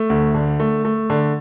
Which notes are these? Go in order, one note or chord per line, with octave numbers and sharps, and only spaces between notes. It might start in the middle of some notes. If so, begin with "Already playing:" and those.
Already playing: A3
D2
D3
A3
A3
D3